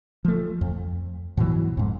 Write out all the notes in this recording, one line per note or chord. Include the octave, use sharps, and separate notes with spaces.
F3 A3
F2
G#2 B2 E3 F#3
F2 G#2